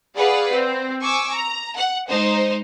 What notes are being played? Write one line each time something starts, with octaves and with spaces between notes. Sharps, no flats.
G#4 B4 D5 F5 F#5
C4
G#5 C#6 D6 E6
A#5
F#5
G#3 D#4 C5